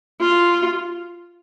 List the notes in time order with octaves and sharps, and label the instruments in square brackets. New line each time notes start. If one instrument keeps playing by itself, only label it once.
[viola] F4